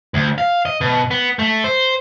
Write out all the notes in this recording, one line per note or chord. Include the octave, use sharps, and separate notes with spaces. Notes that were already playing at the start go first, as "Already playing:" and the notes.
D2
F5
D#5
B2
B3
A3
C5